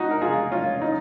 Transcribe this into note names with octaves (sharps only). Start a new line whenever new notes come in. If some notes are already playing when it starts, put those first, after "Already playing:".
Already playing: D#4 F#4
A#4
F4 G#4
C#4 F4
D#4